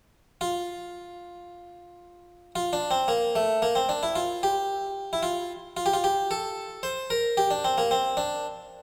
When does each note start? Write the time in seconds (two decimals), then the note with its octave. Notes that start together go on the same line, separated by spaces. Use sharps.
0.41 F4
2.56 F4
2.73 D4
2.91 C4
3.08 A#3
3.36 A3
3.62 A#3
3.76 C4
3.89 D4
4.03 E4
4.16 F4
4.43 G4
5.13 E4
5.23 F4
5.77 F4
5.86 G4
5.94 F4
6.04 G4
6.31 A4
6.83 C5
7.10 A#4
7.37 G4
7.51 D4
7.65 C4
7.78 A#3
7.91 C4
8.17 D4